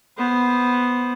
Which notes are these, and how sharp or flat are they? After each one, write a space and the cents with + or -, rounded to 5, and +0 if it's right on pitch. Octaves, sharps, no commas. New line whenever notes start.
B3 +0 C5 +0